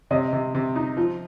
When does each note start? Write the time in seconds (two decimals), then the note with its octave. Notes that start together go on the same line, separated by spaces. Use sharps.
0.11 C3 D#5
0.33 C3
0.55 C3
0.76 D#4
0.97 F3